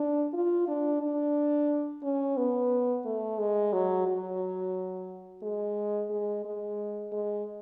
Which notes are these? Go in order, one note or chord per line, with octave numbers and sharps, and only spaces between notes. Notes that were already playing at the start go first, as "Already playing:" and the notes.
Already playing: D4
F4
D4
D4
C#4
B3
A3
G#3
F#3
F#3
G#3
G#3
G#3
G#3